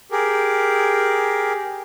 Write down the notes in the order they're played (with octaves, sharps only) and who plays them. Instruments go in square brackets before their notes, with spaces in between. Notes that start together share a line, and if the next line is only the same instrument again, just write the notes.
[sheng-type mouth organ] G4 G#4 A#4